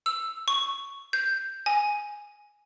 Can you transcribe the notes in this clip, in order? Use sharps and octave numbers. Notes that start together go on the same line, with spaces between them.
E6
C#6
G6
G#5